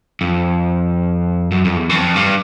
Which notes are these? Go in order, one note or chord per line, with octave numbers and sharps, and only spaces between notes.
F2
F#2
F2
E2
F#2
F2
G2